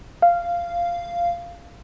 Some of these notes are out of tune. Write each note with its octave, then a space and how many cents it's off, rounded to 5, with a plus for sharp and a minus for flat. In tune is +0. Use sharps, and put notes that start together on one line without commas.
F5 -10